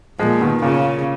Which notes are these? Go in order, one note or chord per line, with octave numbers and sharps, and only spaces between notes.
A#2 F3 G#3
B2 D#3
A#2 C#3